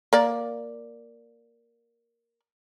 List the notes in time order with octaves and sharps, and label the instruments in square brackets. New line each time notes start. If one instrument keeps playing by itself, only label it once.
[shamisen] A#3 D5